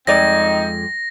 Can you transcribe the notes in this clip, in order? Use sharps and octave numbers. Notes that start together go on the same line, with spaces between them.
F2 G#3 C4 D#4 D5 A#6